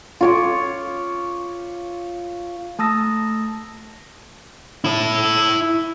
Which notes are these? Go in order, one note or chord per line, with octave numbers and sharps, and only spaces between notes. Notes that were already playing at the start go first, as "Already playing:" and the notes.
F4 C#5 D6
A3 A5 D#6 E6 A#6
E4 A5